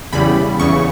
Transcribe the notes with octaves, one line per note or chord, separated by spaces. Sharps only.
E2 C#3 G3 B5
E2 C#3 C#6